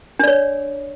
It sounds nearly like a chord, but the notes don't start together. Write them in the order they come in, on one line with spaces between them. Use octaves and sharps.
D4 D5 C#5